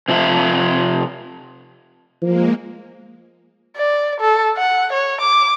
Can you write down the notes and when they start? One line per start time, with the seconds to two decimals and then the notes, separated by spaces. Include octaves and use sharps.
0.08 C3 F3 D#4 E5 F5
2.22 F3 G#3 A#3
3.77 D5
4.20 A4
4.57 F#5
4.93 C#5
5.21 D6